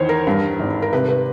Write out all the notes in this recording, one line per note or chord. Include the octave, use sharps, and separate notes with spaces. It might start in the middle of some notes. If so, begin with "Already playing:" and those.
Already playing: E2 D#3 C5 C#5
A#4
G2
G#1
A#4
C3 B4
B4